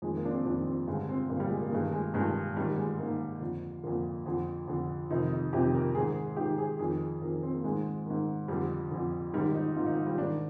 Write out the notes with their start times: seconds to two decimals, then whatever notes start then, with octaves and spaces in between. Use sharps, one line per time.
0.02 F2 D#3 G#3
0.17 A#3
0.25 D4
0.31 C4
0.45 F2 D#3 D4
0.66 C4
0.88 G2 D3 G#3
1.09 C4
1.30 G2 D3 A#3
1.40 G3
1.50 G#3
1.61 A#3
1.72 G2 D#3 G#3
1.92 G#3
2.14 G2 D#3 G#3
2.56 G#2 D#3 G3
2.78 G#3
2.98 G#2 D#3 A#3
3.41 F2 D3
3.83 F2 D3 A#3
4.26 F2 D3
4.68 F2 D3
5.10 F2 C3 D#3 D#4
5.32 D#4
5.53 F2 C3 D#3 G4
5.74 A#4
5.94 G#2 D#3 G#4
6.37 G#2 D#3 G4
6.58 G#4
6.79 F2 D#3 G#4
7.22 F2 A#4
7.25 D#3
7.43 C4
7.53 A#3
7.63 G#2 D#3 G#3
8.06 G#2 D#3
8.48 F2 D3 G3
8.91 F2 D3
9.33 G#2 D#3 G3
9.54 D#4
9.76 G#2 D#3 F4
9.86 D#4
9.97 F3
10.07 G3
10.18 G#2 D#3 D4